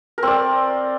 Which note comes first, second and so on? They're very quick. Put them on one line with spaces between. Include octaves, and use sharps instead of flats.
A#4 C4 D5